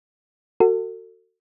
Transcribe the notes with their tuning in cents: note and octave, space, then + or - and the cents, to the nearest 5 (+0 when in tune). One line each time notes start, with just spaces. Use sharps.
F#4 +0 A4 +35